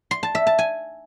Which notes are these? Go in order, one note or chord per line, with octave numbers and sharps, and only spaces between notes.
C6
A5
E5
A5
G#5